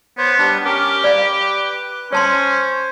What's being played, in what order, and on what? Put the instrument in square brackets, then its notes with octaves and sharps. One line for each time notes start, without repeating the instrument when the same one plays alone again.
[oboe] B3 [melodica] C5 C#5
[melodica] G3 D4 F#5
[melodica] C#4 A#4 [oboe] G4
[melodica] B4 [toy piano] D5 F5
[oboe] C#4 [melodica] C5 [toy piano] C#5 A5 C6